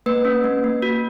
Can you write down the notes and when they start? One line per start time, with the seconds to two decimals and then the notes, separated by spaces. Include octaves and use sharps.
0.06 A#3 B4
0.25 C#4
0.44 A#3
0.64 A#3
0.82 F#4